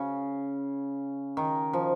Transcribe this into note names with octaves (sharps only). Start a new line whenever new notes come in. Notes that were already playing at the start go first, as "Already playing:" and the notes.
Already playing: C#3
D#3
F3